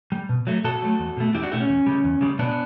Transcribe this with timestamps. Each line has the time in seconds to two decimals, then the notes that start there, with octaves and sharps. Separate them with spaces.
0.12 G3
0.29 B2
0.47 F#3 A3
0.64 B2 F#4 A4
0.82 F#3 A3
0.99 E2
1.17 B2 A3
1.34 E2 E4 G4
1.43 D4 F#4
1.51 B2 A3 E4 G4
1.60 C#4
1.69 E2
1.86 C#3 G3
2.04 E2
2.21 C#3 G3
2.39 B2 B3 D4